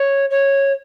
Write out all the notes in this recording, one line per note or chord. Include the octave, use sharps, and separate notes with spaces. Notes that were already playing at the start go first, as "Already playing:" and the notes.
Already playing: C#5
C#5